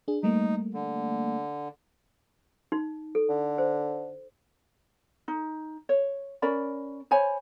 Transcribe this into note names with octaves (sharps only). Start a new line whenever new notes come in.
D4 G#4
G3 A3 A#3 D#4
D3
D#4
A4
D3
C5
D#4
C#5
C#4 A#4 D5 B5
C5 C#5 G#5 B5